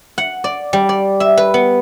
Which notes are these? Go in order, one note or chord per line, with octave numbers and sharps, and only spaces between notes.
F#5
D5
G3
D5
E5
B4
B3